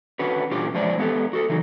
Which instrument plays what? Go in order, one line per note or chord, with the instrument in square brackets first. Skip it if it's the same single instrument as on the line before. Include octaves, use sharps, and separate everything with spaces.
[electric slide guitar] D3 C#4 F#4 B4
A#2 D3 C#4 F4 G4
F3 G#3 C#4 D4 C5 D5
G#3 B3 D#4 G4 A4
F#4 A4
C#3 E3 F#3 D#4